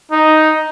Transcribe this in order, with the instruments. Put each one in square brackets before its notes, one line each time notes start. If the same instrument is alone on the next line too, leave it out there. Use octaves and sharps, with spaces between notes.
[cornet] D#4